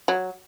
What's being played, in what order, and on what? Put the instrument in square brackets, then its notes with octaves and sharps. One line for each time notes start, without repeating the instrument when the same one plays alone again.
[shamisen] F#3